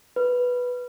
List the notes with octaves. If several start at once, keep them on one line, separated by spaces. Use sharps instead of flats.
B4